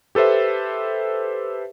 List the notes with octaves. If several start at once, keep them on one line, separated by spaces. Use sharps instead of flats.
G4 A4 B4 C5 E5